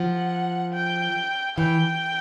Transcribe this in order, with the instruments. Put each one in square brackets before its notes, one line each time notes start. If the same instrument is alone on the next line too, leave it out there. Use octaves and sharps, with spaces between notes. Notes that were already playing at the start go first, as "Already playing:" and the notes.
Already playing: [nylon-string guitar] F3 [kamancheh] F#5
[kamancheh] G5
[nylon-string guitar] E3 [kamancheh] G5